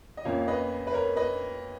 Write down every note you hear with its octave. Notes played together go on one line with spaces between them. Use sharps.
D#5
F2 C#3 F3 A#3 C#5 F5
F5
B4 D#5
B4
A#4 C#5
B4 D#5